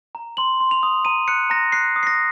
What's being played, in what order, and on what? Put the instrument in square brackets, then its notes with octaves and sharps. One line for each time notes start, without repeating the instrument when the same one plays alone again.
[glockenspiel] A#5
C6 F#7
C6
F7
D#6
A#5 D#7
F#6 C#7
A#5 A#6
F#6 C7
D#6
C7
A#6